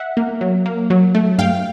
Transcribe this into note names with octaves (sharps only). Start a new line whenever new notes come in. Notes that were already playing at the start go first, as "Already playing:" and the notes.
Already playing: E5 F#5
A#3
F#3
A#3
F#3
A3
G2 F5 G5